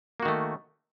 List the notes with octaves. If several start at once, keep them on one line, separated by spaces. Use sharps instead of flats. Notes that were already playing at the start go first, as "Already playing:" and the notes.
D#3 A3 A#3 F#4